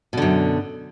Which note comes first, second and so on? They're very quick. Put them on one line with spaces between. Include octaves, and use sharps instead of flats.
B2 D3 F#2